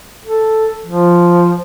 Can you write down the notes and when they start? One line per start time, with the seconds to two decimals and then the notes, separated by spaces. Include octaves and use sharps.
0.24 A4
0.86 F3